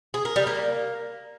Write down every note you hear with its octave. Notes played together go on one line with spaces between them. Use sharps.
G#4
A#4
G3
A#3